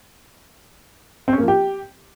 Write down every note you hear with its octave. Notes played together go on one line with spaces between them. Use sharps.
C4
C#4
A#3
F3
G4